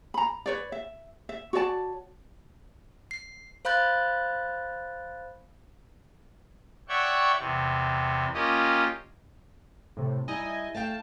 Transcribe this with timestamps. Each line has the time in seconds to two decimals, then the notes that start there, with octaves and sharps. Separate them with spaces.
0.14 A#5 B5
0.46 B4 C#5 D5
0.72 E5
1.29 E5
1.53 F#4 C#5 D5 A5
3.11 C7
3.65 C5 F5 B5 F#6 G6 A6
6.89 C#5 D5 E5 F#5 G5 C#6
7.39 E2 C3
8.34 A#3 C#4 F4 G4 D#5
9.97 A2 C3
10.28 G3 D#4 E4 D#5 G#5
10.74 A3 F5 G5 A5